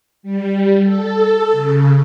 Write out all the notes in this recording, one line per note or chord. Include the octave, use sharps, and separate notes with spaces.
G3
A4
C#3